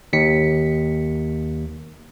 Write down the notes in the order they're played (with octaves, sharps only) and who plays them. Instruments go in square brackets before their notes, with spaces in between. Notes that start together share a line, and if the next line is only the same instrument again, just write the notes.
[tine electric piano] D#2 B6 C#7